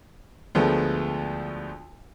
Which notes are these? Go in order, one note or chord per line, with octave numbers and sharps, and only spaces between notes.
D2 F3 G#3 A3 B3